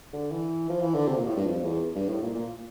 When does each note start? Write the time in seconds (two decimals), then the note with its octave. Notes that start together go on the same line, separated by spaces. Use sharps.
0.13 D3
0.31 E3
0.69 F3
0.82 E3
0.94 D3
1.08 C3
1.17 A#2
1.27 A2
1.36 G2
1.46 F2
1.64 E2
1.95 G2
2.09 A2
2.22 A#2
2.34 A#2